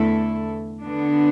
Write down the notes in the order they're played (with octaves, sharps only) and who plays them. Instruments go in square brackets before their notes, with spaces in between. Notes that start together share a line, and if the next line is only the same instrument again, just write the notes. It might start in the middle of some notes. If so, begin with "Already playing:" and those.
Already playing: [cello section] E2 D3 A3 E4 A4
D3 B3 D4